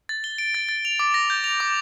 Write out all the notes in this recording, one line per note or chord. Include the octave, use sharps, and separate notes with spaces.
A6
G7
D7
A6
A6
F7
D6
A#6
G6
F7
D6